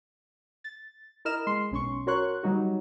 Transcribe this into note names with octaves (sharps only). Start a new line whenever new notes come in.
A6
E4 A#4 D#5 F6 E7
G#3 C6 C7
B1 C#4 C6 C#6
F#4 A#4 C#5 C6 C#6 F#6
F#3 G3 D#4 F#4